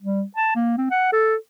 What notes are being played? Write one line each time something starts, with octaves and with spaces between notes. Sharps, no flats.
G3
A5
A#3
C4
F#5
A4